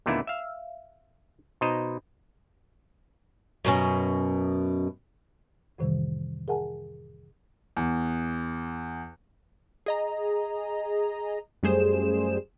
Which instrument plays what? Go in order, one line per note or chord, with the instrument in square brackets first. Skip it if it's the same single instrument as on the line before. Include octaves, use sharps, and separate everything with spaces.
[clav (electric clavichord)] D#2 A#2 D3 A3 B3 E4
E5 F5
B2 D#4 C5 D#5 A#5
[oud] F#2 B2 C#4
[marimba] F2 A2 C3 D#3 E3 G3
G#4 A#4 E5 F#5 G#5 A5
[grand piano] E2
[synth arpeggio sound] G#4 D#5 A#5
F#2 G3 A3 G#4 C5 E7